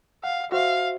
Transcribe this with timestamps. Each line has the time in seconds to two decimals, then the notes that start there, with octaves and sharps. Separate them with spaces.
0.24 F5 F#5
0.52 F#4 C5 E5 F5